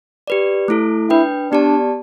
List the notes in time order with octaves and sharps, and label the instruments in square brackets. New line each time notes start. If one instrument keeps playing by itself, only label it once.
[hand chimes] G4 B4 D5
A3 E4 A4
[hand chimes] D4 B4 G5 [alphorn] E4
[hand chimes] B3 G4 D5 A5 [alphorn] D4